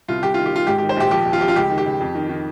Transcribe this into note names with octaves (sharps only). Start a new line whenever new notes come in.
C2 F4
C2 G4
F4
D#3
G4
D#3 F4
G#2 G4
G4
D#3
C5
A#1 G4
F3 G4
D#2
F4
F3 G4
F4
C#2 G4
D#3
G4
C#2
F2
D#3
D#3